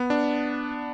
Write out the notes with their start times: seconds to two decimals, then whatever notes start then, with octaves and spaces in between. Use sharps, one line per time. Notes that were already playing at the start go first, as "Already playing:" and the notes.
Already playing: B3
0.10 D4